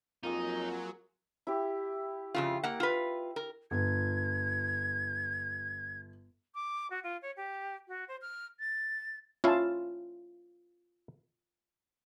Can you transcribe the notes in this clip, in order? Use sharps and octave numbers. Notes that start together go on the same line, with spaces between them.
F2 F#3 A#3 D#4 F4 G#4
E4 G4
F2 C#3 F4
A#3 F#5
F4 B4
A#4
G1 G#6
D6
F#4
F4
C#5
G4
F#4
C5
F6
A6
C#4 E4 F4 F5 A5